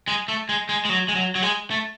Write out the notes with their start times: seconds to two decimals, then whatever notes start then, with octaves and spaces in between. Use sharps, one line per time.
0.08 G#3
0.28 A3
0.49 G#3
0.69 G#3
0.85 G#3
0.89 F#3
1.08 G#3
1.15 F#3
1.35 F#3
1.42 G#3
1.71 A3